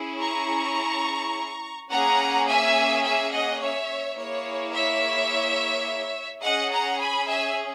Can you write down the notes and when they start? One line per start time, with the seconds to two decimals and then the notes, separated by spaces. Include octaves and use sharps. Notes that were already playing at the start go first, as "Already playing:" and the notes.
Already playing: C#4 E4 G#4
0.21 A#5 C#6
1.90 A#3 C#4 G#4 F#5 A#5
2.47 E5 G#5
3.03 E5 G#5
3.32 D#5 F#5
3.60 C#5 E5
4.17 A#3 E4 G#4 C#5
4.73 C#5 E5
6.43 C#4 G#4 D#5 F#5
6.72 F#5 A#5
6.99 G#5 B5
7.28 E5 G#5